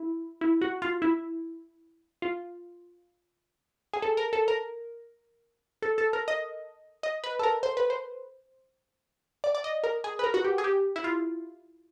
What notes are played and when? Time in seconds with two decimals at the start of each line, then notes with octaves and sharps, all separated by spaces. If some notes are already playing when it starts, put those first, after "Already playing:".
Already playing: E4
0.41 E4
0.61 F#4
0.82 F4
1.02 E4
2.22 F4
3.93 G#4
4.02 A4
4.17 A#4
4.33 A4
4.48 A#4
5.82 A4
5.98 A4
6.13 A#4
6.28 D#5
7.03 D#5
7.24 B4
7.39 A4
7.43 A#4
7.63 C5
7.77 B4
7.90 C5
9.44 D5
9.55 D5
9.64 D#5
9.84 A#4
10.04 G#4
10.19 B4
10.24 A#4
10.34 F#4
10.44 G4
10.58 G#4
10.64 G4
10.96 E4
11.04 F4